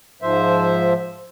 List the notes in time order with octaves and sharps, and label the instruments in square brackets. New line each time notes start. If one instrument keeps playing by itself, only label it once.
[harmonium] G#2 F3 C5 E5